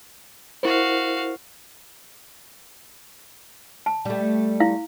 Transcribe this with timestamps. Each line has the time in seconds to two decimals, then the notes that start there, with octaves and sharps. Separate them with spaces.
0.63 E4 F#4 A#4 C5 F5
3.86 A5
4.05 G3 A3
4.60 E4 F5